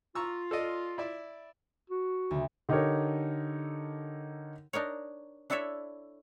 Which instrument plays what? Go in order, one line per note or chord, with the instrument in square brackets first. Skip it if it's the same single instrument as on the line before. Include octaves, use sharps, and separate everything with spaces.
[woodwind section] F4 [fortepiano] A#5 C#6 E6
[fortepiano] A4 D5 D#5
E4 D5 E5
[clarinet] F#4
[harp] D2 C#3
[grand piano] D3 D#4 G4 A4 A#4 C#5
[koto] D4 D#4 A#4 C#5
D4 E4 A4 C#5 E5